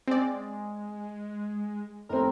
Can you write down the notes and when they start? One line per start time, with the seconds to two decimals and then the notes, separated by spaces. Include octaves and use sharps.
0.08 G#3 C4 D5
2.09 F1 C4 A#4